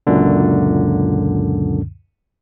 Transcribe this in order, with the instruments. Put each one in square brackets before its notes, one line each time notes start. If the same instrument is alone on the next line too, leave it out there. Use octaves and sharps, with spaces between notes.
[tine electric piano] C#2 F#2 A#2 D3